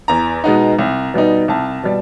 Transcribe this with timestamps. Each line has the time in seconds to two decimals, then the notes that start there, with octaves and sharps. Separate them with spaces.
0.08 E2 A#5
0.44 B2 G#3 B3 D#4
0.79 C2
1.14 B2 G3 B3 D#4
1.48 C2 A5
1.83 B2 G3